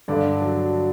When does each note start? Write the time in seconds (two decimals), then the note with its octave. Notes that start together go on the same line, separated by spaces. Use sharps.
0.08 G2 D3 D4
0.41 F#3